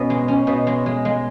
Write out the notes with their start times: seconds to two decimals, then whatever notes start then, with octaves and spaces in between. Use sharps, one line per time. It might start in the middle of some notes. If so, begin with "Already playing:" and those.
Already playing: B2 C#4
0.10 G#3
0.28 C#4
0.47 B2
0.67 G#3
0.86 G#3
1.05 G#3